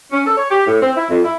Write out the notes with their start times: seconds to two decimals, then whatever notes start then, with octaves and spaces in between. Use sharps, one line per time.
0.12 C#4
0.26 A4
0.37 C#5
0.50 G4
0.67 A2
0.82 C4
0.96 E4
1.09 F2
1.24 E4